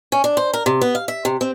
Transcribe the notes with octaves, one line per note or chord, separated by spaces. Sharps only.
C#4
D4
C5
A#4
C3
B3
F5
E5
C3
C4